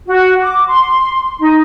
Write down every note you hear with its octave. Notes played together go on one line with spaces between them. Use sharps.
F#4
D6
C6
D#4